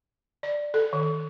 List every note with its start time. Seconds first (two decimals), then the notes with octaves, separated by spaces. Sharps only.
0.43 D5
0.74 A4
0.93 D#3